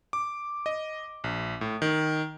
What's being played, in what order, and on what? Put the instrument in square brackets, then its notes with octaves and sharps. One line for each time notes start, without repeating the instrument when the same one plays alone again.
[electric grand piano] D6
D#5
A#1
A2
D#3